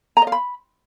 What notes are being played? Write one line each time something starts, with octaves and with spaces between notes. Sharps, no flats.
A#5
D#5
F5
B5